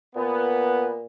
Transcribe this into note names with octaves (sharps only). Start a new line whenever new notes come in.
A#2 B3